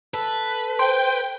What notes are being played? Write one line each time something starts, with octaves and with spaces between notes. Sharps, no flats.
A4 B4
C5 G5